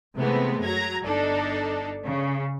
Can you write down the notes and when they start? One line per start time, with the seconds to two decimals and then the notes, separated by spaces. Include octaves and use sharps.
0.17 C3 E3 G#3 A3 B3 C4
0.60 F#2 F#3 A#5 G#6
1.03 G1 D4 D#4 A4
2.05 C#3